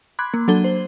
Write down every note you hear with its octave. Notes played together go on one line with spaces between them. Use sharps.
B5 C6 D6 F#6 G#6
A#3
F#3 D4 A4 G7
C5